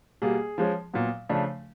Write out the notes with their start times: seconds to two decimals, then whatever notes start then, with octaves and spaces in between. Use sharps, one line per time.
0.22 B2 G3 A#3 G#4
0.58 F3 G#3 C#4
0.93 A#2 F#3 B3
1.29 C#3 F3 A3 D4